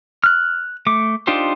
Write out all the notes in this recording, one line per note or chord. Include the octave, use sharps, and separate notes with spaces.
F6 F#6
A3 D6
D4 D#4 F4 G4 C5